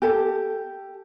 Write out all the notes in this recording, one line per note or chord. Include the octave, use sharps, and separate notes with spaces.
G4 A4 A5